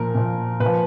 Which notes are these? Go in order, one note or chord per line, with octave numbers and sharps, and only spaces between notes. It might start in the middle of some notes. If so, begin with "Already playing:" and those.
Already playing: A#2 F3 A#4
A#2 F3
A#2 B4
F3